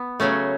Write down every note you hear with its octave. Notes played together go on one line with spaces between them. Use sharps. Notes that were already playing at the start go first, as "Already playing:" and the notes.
Already playing: B3
C#3 F#3 A3 C#4